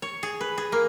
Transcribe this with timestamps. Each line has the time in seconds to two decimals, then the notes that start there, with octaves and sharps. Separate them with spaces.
0.02 C#5
0.23 G#4
0.41 B4
0.58 G#4
0.72 A#3